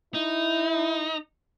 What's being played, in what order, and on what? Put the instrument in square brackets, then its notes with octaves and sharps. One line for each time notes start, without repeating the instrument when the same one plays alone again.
[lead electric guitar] D#4 [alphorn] E4